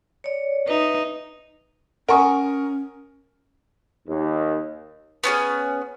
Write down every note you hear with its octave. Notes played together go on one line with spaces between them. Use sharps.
C#5 D5
D#4 B4 E5
C#4 A#4 F#5 G#5 C#6 D#6
D#2
B3 C#4 F#4 G#4